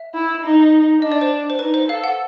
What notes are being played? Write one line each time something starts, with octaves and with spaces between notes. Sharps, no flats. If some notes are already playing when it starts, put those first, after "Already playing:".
Already playing: E5
E4
D#4
D4 D#5
D5
C5
C5
D#4 B4
C5
A4 F5
F#5